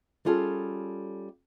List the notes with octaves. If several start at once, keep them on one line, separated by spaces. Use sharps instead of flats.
G3 C#4 F4 G#4 A4